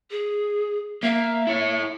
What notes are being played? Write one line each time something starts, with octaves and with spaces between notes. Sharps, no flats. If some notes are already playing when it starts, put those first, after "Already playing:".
G#4
A#3 E5
E4 C#5